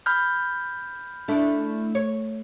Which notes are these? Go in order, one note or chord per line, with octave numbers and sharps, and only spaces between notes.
B5 F6 G6
A3 D4 E4
C#5